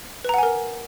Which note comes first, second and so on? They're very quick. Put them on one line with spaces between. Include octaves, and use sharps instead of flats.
B4 A#5 F#5 G#5 A#4